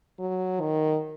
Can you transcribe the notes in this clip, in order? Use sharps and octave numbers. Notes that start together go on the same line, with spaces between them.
F#3
D#3